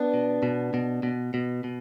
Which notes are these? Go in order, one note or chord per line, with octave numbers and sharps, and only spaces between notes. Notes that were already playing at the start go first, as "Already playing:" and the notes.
Already playing: B3 D4
B2
B2
B2
B2
B2
B2